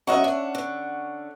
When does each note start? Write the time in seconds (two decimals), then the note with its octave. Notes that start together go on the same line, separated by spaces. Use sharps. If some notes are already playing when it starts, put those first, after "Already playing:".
0.07 F#2 C#4 D#5 E5 F#5 C#6
0.24 D4
0.55 D3